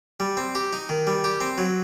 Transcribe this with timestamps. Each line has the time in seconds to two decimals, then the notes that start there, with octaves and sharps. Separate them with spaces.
0.20 G3
0.37 C4
0.55 G4
0.73 D#4
0.89 D#3
1.07 G3
1.24 G4
1.41 C4
1.58 F#3